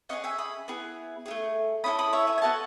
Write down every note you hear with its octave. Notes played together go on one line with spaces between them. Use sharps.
C#4 E4 G#4 D#5 F#5
E5 G#5
B5 D#6
B3 E4 G#4
E4 G#4
A3
C#4 E4 A4 B5 D#6
B5 D#6
C#5 E5
E5 G#5
G#5
B3 F#4 A4 F#5 A5